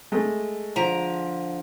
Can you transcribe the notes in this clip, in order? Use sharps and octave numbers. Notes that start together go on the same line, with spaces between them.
G#3 A3
D3 F3 A#5